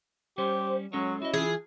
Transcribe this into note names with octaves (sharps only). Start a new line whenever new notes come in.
G3 C#4 G4 C5
F#3 G#3 C#4 A4 C#5
E4 F#4 D#5
E3 F4 G#4